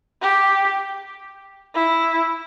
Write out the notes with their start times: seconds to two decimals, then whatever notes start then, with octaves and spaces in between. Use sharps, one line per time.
0.22 G4
1.74 E4